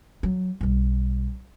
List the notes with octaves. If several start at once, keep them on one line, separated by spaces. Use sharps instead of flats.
F#3
B1 G3